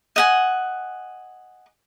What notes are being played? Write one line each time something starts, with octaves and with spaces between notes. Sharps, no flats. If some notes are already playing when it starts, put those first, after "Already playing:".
D#5 F#5 G#5